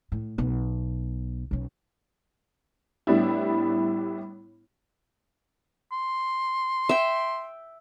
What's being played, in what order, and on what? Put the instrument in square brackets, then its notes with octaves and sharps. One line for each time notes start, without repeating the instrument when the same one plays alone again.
[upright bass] A2
B1 B3
B1 C#4
[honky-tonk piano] A2 G3 B3 D4 E4
[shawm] C6
[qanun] E5 G5